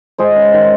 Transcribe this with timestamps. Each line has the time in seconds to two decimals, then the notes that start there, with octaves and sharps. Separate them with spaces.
0.18 G#3 G#4 C5
0.36 C#4
0.53 D#3